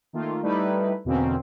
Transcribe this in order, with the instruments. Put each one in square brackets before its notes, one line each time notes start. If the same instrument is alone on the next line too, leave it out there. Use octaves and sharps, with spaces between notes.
[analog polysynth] D#3 A3 A#3 F4
G3 A3 D#4 E4 B4
E2 B2 D3 A#3 C4 C#4